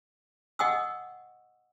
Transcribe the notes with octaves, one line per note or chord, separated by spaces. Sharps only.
D#5 F#5 G5 C#6 D#6 E6